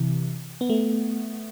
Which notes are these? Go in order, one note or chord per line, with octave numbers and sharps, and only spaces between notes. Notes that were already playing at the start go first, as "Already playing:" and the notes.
Already playing: C3 E3
B3
A3